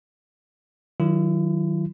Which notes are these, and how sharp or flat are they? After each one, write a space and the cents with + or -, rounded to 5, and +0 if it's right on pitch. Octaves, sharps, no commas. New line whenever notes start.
D#3 +0 F#3 +0 E4 +45